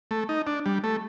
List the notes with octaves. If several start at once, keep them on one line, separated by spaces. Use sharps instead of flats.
A3
D#4
D4
G3
A3